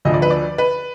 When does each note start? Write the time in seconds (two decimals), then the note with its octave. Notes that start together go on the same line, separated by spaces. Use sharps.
0.05 D2 D3 F3 D#5
0.14 D5
0.22 B4
0.31 D5
0.58 B4